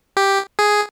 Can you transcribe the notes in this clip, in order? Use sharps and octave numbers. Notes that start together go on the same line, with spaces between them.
G4
G#4